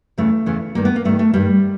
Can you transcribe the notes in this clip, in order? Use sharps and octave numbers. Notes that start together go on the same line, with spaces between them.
E2 C#3 E3 A3
E2 C#3 E3
G2 D#3 A#3
B3
A#3
G2 D#3 A3
A3
G2 D#3 G3